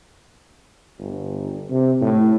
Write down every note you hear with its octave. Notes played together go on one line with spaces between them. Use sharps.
G1
C3
A2